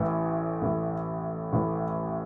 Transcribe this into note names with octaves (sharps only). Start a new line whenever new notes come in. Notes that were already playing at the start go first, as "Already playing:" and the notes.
Already playing: A1 A2 E3
A1 A2 E3
A1 A2 E3